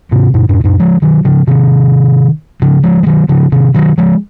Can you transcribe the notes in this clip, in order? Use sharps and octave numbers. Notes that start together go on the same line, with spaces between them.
G#2 C3
F#2 A#2
F2 G#2
F#2 A#2
F3 G#3
D#3 F#3
C#3 F3
C3 D#3
C#3 F3
F3 G#3
G#3
D#3 F#3
C#3 F3
C3 D#3
D#3 F#3
F3 G#3